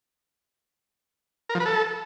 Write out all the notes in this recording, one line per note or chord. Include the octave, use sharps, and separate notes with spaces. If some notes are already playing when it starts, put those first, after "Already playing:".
A#4
F3
B4
A4